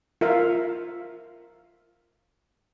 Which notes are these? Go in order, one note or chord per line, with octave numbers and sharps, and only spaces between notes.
F4 A#4 E5 F5